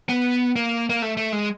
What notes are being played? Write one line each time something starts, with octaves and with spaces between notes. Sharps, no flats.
B3
A#3
A#3
A3
A3
G#3